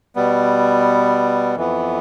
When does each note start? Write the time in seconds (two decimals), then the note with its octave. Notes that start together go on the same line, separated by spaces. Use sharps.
0.16 B2 G3 B3
1.57 F2 E3 B3